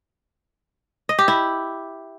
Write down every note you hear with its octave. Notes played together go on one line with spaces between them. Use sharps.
D#5
G4
E4